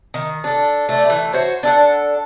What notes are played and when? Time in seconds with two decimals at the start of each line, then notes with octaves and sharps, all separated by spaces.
0.14 D#3
0.44 D4 A4
0.89 A3 D5
1.05 E3 A3
1.33 F#4 C5 C#5
1.63 D4 A4 F#5